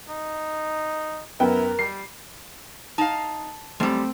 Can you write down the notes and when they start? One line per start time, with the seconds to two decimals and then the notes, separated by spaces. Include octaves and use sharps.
0.08 D#4
1.40 F#2 B3 E4 A#4 G5
1.79 G3 C7
2.98 D#4 F5 A5
3.80 F#2 G3 A3 C4